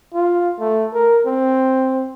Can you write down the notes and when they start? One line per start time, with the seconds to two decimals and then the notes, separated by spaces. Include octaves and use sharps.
0.14 F4
0.60 A3
0.94 A#4
1.26 C4